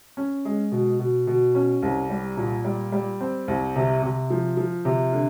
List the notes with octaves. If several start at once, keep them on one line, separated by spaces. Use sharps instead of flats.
C#4
G#3
B2
B2
B2
C#4
C2
G3
A#2
G3
G3
C4
C2
C3
C3
F3
F3
C3
D3